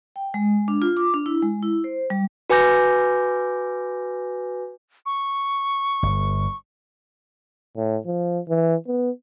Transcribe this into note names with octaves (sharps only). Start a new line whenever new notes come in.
G5
G#3
D4
F4
D6
D4
E4
G#3
E4
C5
G3
F#4 B4 G#5 D6 G6 A#6
C#6
G1
A2
F3
E3
B3